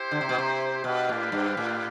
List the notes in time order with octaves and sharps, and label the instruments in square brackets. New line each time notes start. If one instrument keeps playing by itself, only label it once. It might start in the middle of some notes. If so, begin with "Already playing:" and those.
Already playing: [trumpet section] E4 G4 C5
[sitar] D3
C3
B2
C3
[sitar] B2 [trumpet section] D4 G4 B4 F5
[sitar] A2
G2
A2